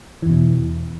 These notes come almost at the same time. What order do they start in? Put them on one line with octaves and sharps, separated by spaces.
E3 E2 B2